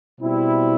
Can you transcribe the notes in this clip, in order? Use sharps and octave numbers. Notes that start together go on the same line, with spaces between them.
B2 G3 C4 E4